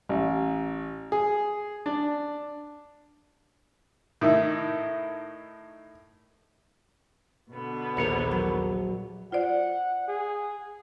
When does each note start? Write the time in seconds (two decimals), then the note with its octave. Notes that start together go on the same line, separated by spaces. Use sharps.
0.09 A1
1.12 G#4
1.86 D4
4.21 A2 D#3 D#4 E4
7.52 B2 D3 B3
7.97 A#1 D#2 A#4 C#5
8.31 F#3
9.32 F4 C5 D5 F#5
10.08 G#4